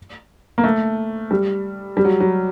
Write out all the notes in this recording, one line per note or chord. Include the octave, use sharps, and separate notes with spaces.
A#3
A3
G3
G3
F#3
F#3